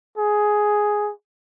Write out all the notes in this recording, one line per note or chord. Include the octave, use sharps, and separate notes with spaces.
G#4